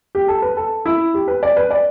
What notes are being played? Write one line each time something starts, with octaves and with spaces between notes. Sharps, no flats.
G4
A4
B4
A4
E4
G4
B4
D5
B4
D5